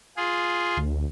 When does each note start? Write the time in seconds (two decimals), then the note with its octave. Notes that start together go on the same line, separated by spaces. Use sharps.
0.17 F4 G#4
0.77 D2